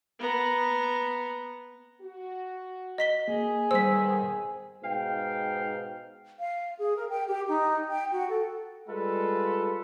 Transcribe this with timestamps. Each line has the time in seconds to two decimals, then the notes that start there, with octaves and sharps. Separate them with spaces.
0.19 B3 A#5
2.01 F#4
2.98 D#5 B6 G7
3.28 A#3 G#4
3.71 D#3 G3 B3 C5 E6 B6
4.83 G#2 B2 F5 G5
6.39 F5
6.79 G#4
6.96 A#4
7.09 G5
7.28 G4
7.48 D#4
7.89 G5
8.12 F#4
8.29 A4
8.88 G3 G#3 F4 A4 B4